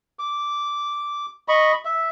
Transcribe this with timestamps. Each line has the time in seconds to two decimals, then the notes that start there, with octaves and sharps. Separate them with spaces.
0.19 D6
1.48 D#5 B5 C#6
1.85 E5